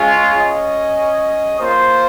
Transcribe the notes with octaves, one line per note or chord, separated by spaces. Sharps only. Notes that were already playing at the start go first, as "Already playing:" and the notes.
Already playing: G#3 C#4 F4 G#4
C#4 G#4 D#5
A#3 F4 C5